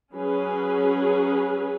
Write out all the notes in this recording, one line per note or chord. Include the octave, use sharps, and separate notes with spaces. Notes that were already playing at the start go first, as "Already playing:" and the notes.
F#3 C#4 G#4 B4